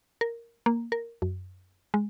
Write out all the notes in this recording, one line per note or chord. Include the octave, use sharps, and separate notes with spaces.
A#4
A#3
A#4
F#2
G#3